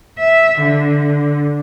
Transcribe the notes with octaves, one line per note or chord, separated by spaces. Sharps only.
E5
D3